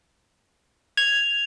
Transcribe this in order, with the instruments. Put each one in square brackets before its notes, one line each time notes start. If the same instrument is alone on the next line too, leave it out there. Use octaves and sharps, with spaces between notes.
[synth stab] G#6 [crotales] F7